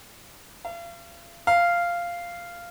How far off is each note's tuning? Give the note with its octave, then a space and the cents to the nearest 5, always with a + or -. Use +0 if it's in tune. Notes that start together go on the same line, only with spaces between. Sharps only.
F5 -40
F5 -10